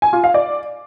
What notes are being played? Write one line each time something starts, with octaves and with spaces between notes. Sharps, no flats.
G#5
F4
F5
D5